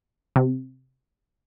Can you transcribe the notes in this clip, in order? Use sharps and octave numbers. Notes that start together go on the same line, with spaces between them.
C3